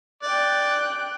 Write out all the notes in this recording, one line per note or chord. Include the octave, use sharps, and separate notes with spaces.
D5 G5 F#6